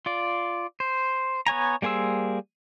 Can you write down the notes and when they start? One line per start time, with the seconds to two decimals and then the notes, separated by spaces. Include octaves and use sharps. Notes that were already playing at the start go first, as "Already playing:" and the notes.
0.06 F4 D5
0.80 C5
1.47 B3 C#5 G#5 A#5
1.82 G3 A#3 G#4 C5 E6